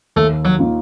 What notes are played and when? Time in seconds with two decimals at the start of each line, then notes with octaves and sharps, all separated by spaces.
0.16 D#2 A3
0.45 F#3
0.58 D#3 A#3 F4